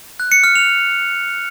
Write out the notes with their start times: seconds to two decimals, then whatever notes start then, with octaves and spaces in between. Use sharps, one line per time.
0.20 F#6
0.32 C#7
0.44 F6
0.55 F7